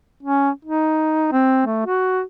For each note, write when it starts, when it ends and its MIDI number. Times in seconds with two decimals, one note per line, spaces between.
0.23 0.50 61
0.65 1.31 63
1.32 1.65 60
1.66 1.81 57
1.86 2.21 66